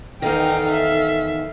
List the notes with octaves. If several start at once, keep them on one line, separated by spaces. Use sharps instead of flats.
E2 D#3 D#4 A4 F5 G5
E5